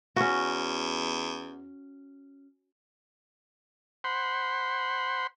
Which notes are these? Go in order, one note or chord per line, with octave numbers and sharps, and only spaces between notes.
E2 C#4 F#4
C5 F#5 B5 C6